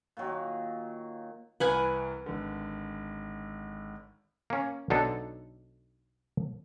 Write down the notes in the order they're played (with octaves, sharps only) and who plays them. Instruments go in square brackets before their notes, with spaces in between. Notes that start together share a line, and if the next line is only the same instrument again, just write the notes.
[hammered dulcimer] A#2 D#3 F#3
[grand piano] C2 E3 F6 [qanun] B4 F#5 G#5
[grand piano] G#1 D3
[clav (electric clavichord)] A#3 C#4
B1 D3 D4 D#4 A4